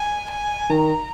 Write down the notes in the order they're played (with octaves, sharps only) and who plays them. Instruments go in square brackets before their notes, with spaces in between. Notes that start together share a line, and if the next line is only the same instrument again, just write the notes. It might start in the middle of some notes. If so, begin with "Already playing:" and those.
Already playing: [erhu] G#5
G#5
[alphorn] D#3 [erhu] A#5